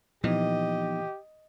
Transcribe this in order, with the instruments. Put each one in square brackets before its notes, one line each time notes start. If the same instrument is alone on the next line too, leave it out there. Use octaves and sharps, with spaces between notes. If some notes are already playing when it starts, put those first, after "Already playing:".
[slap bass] A#2 E3 [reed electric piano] F3 B3 D#4 [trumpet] G4 [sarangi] D#5